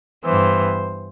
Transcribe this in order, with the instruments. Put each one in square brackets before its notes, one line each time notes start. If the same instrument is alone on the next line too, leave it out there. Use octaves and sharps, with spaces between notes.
[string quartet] G2 E3 B3 C5